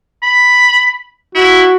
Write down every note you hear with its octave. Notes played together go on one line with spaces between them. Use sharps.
B5
E4 F#4